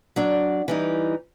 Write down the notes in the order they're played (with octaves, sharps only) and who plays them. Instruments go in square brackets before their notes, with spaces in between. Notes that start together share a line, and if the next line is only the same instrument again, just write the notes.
[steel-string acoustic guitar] F#3 D4 D5
E3 G3 D#4